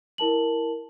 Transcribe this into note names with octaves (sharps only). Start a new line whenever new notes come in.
E4 A#4 A5 F#7